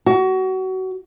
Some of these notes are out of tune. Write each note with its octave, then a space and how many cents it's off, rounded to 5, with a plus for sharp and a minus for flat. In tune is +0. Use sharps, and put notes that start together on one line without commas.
F#4 +25